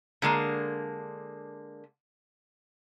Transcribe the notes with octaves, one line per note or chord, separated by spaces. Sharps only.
D3 G#3 A#3